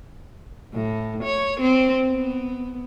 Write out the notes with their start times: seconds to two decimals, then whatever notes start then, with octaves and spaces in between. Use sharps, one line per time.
0.73 A2
1.24 C#5
1.61 C4
2.10 B3